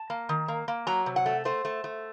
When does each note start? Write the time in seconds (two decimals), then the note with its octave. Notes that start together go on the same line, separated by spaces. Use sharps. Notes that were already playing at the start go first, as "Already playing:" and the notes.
Already playing: A5
0.10 A#3
0.29 D#3
0.48 A#3
0.68 A#3
0.87 F#3 A#5
1.06 C3
1.16 F#5
1.26 A3
1.45 A3 C5
1.65 A3
1.84 A3